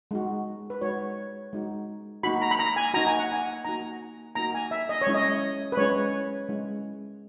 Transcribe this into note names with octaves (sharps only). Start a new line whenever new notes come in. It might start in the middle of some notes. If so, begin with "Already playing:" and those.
G#3 D#4 F#4
B4
G#3 D#4 F#4 C#5
G#3 D#4 F#4
A#3 D#4 F#4 B5
A#5
B5
A#5
G#5
A#3 D#4 F#4 A#5
G#5
F#5
G#5
A#3 D#4 F#4 A#5
A#3 D#4 F#4 A#5
G#5
E5
D#5
C#5
G#3 C#4 E4
D#5
B4
G#3 C#4 E4 C#5
G#3 C#4 E4